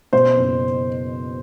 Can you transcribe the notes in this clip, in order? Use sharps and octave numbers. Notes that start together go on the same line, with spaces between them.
B2 C5
F#1